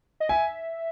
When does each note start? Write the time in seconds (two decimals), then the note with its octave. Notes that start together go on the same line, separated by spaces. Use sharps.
0.20 D#5
0.29 E5 G#5